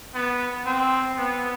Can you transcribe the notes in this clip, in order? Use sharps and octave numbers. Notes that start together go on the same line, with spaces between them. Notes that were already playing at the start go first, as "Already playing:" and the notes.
B3
C4
B3